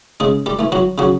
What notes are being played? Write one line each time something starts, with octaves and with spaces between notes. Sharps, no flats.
C#3 G#3 G#4
G3 G4
E3 A3
F#3 F#4
C#3 F#3 F#4